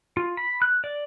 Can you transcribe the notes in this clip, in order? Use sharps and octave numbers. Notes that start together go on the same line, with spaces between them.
F4
B5
F#6
D5